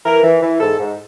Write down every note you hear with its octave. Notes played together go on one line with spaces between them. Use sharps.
E3 A#4
E3
E3
G#2 A4
G#2